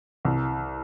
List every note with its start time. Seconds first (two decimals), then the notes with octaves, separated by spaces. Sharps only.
0.25 C2